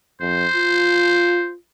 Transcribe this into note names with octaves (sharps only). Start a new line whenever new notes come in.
F2 C5
F4